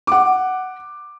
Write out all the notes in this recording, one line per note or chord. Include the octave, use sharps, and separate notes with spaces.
F#5 D6